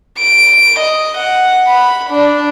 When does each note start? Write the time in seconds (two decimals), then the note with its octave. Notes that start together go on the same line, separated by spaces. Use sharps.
0.18 D7
0.80 D#5
1.18 F#5
1.67 B5
2.10 D4